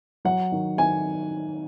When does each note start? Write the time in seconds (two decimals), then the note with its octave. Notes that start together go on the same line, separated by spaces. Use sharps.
0.25 F#3 F#5
0.52 D#3
0.78 D#3 G#5